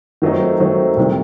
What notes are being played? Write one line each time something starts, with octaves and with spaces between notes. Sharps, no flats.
D#3 F#3 A3 C4 D#4
D#3 F#3 A3 C4 D#4
C2 C3 D#3